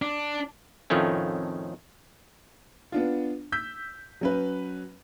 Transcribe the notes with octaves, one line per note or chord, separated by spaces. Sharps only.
D4
F2 A2 D#3 F3 A3 C#4
B3 D4 F4
E6 G6 B6
F#3 C#4 B4